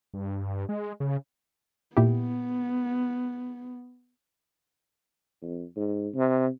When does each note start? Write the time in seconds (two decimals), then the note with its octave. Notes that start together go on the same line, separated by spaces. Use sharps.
0.14 G2
0.69 G#3
1.00 C#3
1.97 A#2 B3 E4 G4
5.42 F2
5.76 G#2
6.14 C3